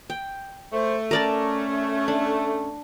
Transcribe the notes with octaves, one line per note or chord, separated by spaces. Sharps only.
G5
A3 C5
C#4 A#4 D5 A5
D4